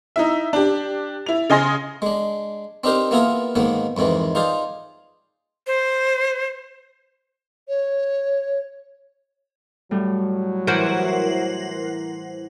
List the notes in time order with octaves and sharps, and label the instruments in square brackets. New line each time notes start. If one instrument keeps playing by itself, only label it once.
[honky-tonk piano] D#4 E4 E5
D4 G4
E4 F7
C#3 D#5 G#5 C6 A#6
[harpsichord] G#3 D4
C4 D4 D#4 G4 A#4 C5
A#3 B3 E4 F4 G#4 A#4
G#2 D#3 A#3 B3
F2 G#2 D#3 E3
D#4 F4 G#4 C5 D5
[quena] C5
[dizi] C#5
[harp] A2 G3 [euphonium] F#3
[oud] E3 F#4 [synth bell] A#4 C5 F#5